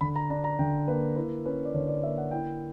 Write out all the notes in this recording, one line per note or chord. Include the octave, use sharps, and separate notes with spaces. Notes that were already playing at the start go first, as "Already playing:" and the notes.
D3 B5
A#5
D4 A#5
A#5
D3 G5
A#3 B4
E4 B4
C#4 B4
D5
D3 C#5
D5
A#3 E5
F#5
E4 G5